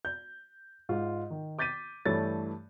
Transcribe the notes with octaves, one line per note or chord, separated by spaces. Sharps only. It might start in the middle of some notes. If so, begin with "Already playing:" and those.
G6
G#2 F4
D#3
D6 G6 A6 B6 D#7
G2 E3 A3 C#5 A6